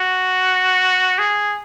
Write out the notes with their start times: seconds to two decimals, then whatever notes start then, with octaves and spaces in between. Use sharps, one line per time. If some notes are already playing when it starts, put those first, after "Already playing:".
Already playing: F#4
1.19 G#4